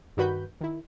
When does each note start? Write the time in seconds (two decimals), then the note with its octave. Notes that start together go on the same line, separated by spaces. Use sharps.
0.17 G2 D#3 F#4 B4 B5 G6
0.61 D#3 E4